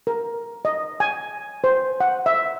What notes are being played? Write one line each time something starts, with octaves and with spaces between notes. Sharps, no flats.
A#4
D#5
G#5
C5
F#5
E5